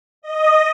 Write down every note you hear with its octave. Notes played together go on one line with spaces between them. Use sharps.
D#5